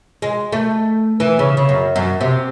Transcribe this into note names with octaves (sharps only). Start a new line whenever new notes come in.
G#3
A3
E3
C#3
C#3
F#2
F#2
C3